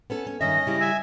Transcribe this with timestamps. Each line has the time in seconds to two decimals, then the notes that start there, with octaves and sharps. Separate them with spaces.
0.10 B3 C#4 A4
0.27 C#4
0.41 G2 D#3 C#4 D#5 E5 A#6
0.66 C#3 G3 E4
0.80 E5 G#5